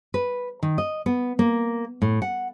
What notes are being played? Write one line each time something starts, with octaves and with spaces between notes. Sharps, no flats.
B4
D#3
D#5
B3
A#3
A2
F#5